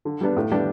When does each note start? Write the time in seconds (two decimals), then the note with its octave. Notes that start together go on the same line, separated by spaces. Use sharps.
0.05 D3
0.21 G3 B3 D4
0.36 A2
0.51 G3 B3 D4 G4